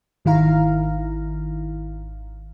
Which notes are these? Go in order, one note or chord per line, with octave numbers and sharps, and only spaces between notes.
G#1 D#3 E4 F5 A#5